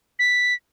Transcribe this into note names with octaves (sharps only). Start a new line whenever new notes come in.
B6